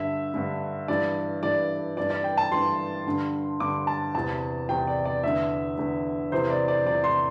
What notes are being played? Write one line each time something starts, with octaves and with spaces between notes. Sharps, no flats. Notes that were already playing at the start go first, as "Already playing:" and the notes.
Already playing: G2 D3 E5
G2 D3
G2 E3 D5
G2 E3 D5
G2 E3 D5
D5
G5
A5
G2 E3 C6
G2 D3
G2 D3 D6
A5
E2 C3 E3 A5
E2 C3 E3 G5
D5
D5
E2 D3 E5
E2 D3
E2 C3 E3 C5
D5
D5
E2 C3 E3 D5
C6